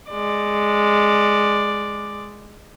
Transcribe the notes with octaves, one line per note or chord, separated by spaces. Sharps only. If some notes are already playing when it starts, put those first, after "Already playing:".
G#3 D5